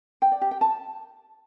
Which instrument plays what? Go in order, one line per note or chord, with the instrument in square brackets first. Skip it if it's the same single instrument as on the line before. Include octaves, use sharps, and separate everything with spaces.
[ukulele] G5
D5
G4
G5
A5